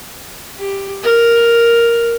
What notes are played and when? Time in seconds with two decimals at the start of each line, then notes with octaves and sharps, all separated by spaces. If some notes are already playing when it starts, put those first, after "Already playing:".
0.58 G4
1.03 A#4